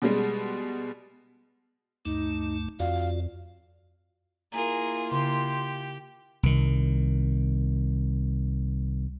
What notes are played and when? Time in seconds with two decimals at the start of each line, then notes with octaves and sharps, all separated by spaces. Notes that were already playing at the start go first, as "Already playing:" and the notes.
0.02 B2 G3 G#3
2.05 D2 G2 A3 D#4
2.80 F2 F4 F#4 D5 F5
4.52 A#3 E4 F4 G#4 A#4 A#5
5.11 C#3 G4 C6
6.43 C2 D#3